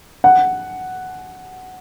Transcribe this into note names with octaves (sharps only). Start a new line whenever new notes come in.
F#5